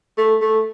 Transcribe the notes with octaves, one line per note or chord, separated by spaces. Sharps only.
A3
A3